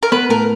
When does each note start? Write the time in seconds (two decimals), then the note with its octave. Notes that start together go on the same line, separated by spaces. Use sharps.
0.03 A#4
0.12 B3 B4
0.29 A2 A#4